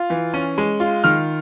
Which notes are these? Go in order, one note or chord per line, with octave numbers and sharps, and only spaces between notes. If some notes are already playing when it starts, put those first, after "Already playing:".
Already playing: F4
E3
C#4
G#3
F4
D#3 F6